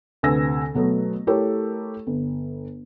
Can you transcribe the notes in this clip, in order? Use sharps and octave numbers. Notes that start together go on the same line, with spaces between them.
D2 C3 B4 G#5 E6 A#6
B2 F#3 A3 B3
A3 E4 G4 A4 A#4 C#5
G1